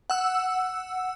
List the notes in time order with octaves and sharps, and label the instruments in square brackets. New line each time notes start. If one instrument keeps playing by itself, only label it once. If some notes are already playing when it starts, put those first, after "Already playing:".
[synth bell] F#5 E6